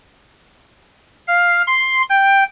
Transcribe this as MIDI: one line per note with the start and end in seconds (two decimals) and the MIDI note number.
1.27 1.62 77
1.67 2.02 84
2.09 2.44 79